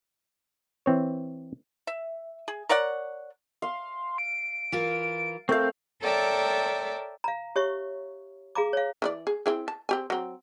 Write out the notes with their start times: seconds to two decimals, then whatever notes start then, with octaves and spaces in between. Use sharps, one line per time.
0.86 E3 C4 C#5
1.87 E5
2.48 G#4
2.69 A#4 C#5 D5 F#5
3.62 F5 C6
4.18 D7
4.72 E3 F4 A#4
5.49 A3 C4 A#4 F5 G6
6.02 A4 A#4 C#5 D5 E5 G5
7.24 F5 A#5
7.56 G4 C#5 E5 C#6
8.55 G#4 F5 A#5 D6
8.73 C#5 F5
9.02 E3 F4 D5
9.27 G#4
9.46 C4 E4 G#4
9.68 A5
9.89 C4 G4 G#5
10.10 F#3 C4